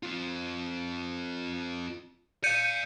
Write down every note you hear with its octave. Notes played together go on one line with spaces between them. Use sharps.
C4 F4
D5 F5 G6 C#7 D#7